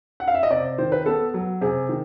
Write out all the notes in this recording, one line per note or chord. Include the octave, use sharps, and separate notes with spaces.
F#5
F5
E5
D#5
C3 D5
D#3 C5
B4
B3 A4
F#3
C3 G#4
D#3